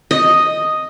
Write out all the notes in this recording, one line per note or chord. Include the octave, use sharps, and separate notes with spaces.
D#5